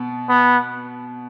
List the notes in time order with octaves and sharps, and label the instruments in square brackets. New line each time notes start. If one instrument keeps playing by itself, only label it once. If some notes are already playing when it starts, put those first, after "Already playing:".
Already playing: [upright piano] B2 B3
[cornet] B3